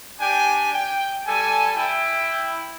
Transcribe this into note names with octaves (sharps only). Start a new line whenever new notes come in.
D4 G4 G5 G#5
G5
G3 A4 G#5
E4 G5